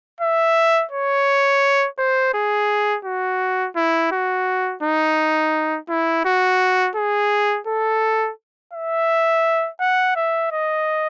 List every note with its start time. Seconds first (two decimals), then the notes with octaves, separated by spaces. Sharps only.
0.20 E5
0.91 C#5
1.98 C5
2.34 G#4
3.05 F#4
3.76 E4
4.12 F#4
4.83 D#4
5.89 E4
6.25 F#4
6.95 G#4
7.67 A4
8.73 E5
9.80 F#5
10.16 E5
10.51 D#5